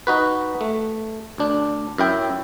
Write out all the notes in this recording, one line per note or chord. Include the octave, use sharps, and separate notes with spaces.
D#4 F#4 B4
A3
D2 D4
F#2 E4 G5